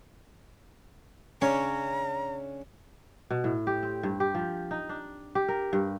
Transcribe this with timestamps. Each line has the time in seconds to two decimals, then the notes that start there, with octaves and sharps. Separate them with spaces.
1.42 C#3 C#4 D4 C#5 A#5
3.31 B2
3.44 A2
3.67 G4
3.83 C4
4.03 G2
4.20 G4
4.35 F3
4.71 D#4
4.89 D4
5.35 G4
5.48 A#4
5.73 G2